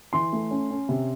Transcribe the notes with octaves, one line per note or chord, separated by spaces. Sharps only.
E3 C6
A3
C#4
C#4
C3